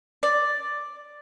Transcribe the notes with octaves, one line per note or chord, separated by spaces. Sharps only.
D5